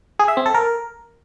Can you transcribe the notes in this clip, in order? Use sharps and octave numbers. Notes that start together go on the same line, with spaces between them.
G#4
E5
C4
A4
A#4